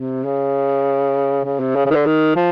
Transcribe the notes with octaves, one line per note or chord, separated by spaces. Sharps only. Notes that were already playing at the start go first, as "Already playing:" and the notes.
Already playing: C3
C#3
C#3
C3
C#3
C#3
D#3
D3
D#3
F3